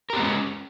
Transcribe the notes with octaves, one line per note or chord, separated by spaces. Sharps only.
G#3 B3 C#4 G4 A#4